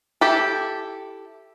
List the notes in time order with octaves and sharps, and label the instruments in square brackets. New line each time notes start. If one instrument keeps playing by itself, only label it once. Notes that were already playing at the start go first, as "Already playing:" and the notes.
[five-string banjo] E4 G4 A4